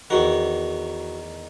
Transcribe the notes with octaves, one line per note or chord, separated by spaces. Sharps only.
E2 D#3 F#4